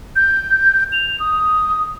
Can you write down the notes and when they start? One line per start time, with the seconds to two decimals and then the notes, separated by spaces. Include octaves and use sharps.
0.16 G6
0.92 F7
1.20 D#6